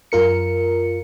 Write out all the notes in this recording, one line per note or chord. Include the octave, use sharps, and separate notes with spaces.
F#2 F4 A#4 C#7